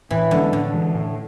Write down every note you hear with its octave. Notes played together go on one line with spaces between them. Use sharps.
A2 E3
D3 F3 G#3 B3
A2 D3
E3 G#3
A2